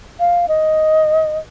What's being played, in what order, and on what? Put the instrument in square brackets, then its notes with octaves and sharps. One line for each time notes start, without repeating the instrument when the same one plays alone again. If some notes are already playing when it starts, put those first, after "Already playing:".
[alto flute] F5
D#5